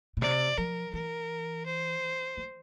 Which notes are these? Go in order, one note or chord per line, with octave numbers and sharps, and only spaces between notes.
A#2
C3 D5
F3 A#4
E3 A#4
C5
E3